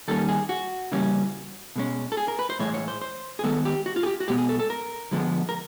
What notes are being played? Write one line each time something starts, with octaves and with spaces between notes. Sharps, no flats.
D#3 G3 A#3 C#4 A4
G#4
F#4
C#3 E3 G3 A#3 C#4
B2 G#3 C#4
A4
G#4
A#4
B4
C5
A2 E3 G#3 C#5
C#5
C5
C5
G#4
D#3 G#3 B3 A4
G4
F#4
F4
G#4
G4
F#4
B2 G#3 B3 G4
G#4
A4
A4
A#4
D3 F3 G#3 B3
A#4